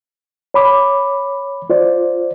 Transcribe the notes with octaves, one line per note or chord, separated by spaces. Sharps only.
C#5 B5 D6
F4 C5 D5